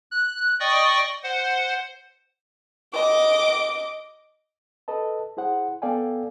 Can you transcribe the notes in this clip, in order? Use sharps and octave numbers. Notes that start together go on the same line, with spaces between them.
F#6
D5 D#5 G5 C#6 D#6
C5 F#5
D#5 D6
A4 B4 D#5 A5
E4 G#4 C5 F#5
B3 A4 D5 F5 G5 G#5